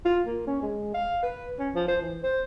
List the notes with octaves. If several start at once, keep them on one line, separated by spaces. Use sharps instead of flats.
F4
A#3
C#4
G#3
F5
B4
C#4
F3
C5
E3
C5